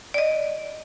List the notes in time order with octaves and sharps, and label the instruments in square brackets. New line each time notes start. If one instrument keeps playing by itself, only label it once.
[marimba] D5 D#5